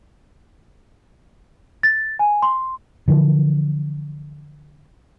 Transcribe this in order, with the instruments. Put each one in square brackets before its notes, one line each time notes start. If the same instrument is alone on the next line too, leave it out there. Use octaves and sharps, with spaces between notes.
[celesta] A6
G#5
C6
[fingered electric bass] D3 E3 F3